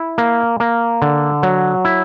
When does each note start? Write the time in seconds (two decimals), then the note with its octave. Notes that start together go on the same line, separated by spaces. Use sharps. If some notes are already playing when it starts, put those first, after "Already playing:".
Already playing: E4
0.18 A#3
0.60 A#3
1.02 D3
1.43 F#3
1.85 E4